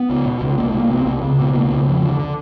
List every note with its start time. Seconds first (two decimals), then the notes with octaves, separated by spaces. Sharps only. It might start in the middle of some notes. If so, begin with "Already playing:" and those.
Already playing: B3
0.09 C#2
0.26 B2
0.41 C#2
0.57 C2 A#3
0.69 A3
0.74 C2
0.80 A#3
0.90 C2 B3
1.01 C4
1.06 C2
1.22 C#2
1.39 B2
1.54 C#2 A#3
1.71 C#2
1.87 F2
2.03 D3
2.19 D3